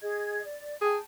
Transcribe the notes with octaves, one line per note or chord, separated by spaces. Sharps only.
G#4 D#5 G#6
D5
G#4 G5 A5